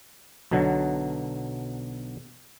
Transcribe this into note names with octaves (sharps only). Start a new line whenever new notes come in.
B1 B2 D3 F#3